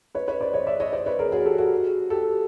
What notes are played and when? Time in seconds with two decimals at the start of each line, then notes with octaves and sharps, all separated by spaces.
0.15 B4 C#5
0.28 B4 C#5
0.41 C5 D5
0.53 C#5 D#5
0.67 D5 E5
0.80 C#5 D#5
0.93 C5 D5
1.06 B4 C#5
1.19 G#4 A#4
1.32 F#4 G#4
1.45 G4 A4
1.58 F#4 G#4
2.10 G4 A4